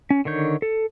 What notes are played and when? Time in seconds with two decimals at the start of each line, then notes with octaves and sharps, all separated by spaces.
0.10 C#4
0.25 D3 D#3 C#5 G6
0.62 A4